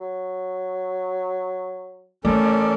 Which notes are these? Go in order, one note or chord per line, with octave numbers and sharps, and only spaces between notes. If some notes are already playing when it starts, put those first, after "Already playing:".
F#3
E3 A3 C#4 A4 A#4 D5